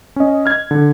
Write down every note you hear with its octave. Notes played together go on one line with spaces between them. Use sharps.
C#4 D#5
F6 G#6
D3